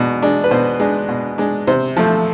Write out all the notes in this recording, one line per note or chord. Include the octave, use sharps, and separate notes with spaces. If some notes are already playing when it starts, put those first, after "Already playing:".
Already playing: B2 G#3 D4
G#3 D4
B4
B2 C5
G#3 D4
B2
G#3 D4
C3 C5
F3 A3